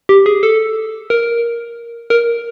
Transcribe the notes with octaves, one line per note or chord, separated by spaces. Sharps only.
G4
G#4
A4
A#4
A#4